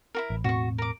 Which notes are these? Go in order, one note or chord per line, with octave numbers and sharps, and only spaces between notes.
E4 F#4 A#4
A1
E1 A2 C4 F#4 C#6
A#4 D6